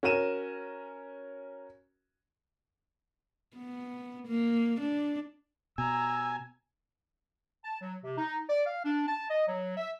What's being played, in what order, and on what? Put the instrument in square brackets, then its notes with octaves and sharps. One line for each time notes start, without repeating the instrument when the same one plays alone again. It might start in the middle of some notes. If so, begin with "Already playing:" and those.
[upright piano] C#4 F#4 A#4 D#7 E7
[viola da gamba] B3
A#3
D4
[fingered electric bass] B2 [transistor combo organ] G#5 [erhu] A#5 [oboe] E6
[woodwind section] A5
F#3
C3
D#4
D5
F5
D4
A5
D#5
F#3
E5